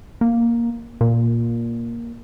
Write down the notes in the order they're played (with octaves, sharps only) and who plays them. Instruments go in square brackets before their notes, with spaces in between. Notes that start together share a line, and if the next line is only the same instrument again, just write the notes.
[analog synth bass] A#3
A#2